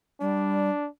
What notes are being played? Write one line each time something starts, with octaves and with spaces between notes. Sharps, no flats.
G3 D4